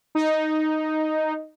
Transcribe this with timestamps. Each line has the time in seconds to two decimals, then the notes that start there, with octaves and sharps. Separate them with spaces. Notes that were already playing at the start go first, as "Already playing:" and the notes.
0.15 D#4